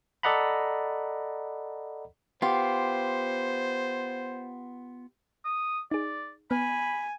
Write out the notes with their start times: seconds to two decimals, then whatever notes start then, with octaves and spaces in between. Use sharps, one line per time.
0.23 A4 D5 D#5 F#5 A#5 B5
2.42 B3 F4 G4 C5
5.45 D#6
5.91 D#4 G#4 D5
6.51 B3 G#5 B5